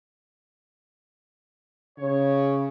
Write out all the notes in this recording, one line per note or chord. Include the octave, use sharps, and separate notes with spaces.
C#3 C#5